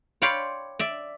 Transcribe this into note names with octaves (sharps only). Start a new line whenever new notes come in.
C#5 D5 F5 G5 B5 C6
D5 E5